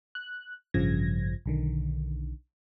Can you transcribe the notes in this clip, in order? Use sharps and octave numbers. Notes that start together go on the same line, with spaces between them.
F#6
A1 G2 C#3 F3 G#6 A#6
B1 D3 D#3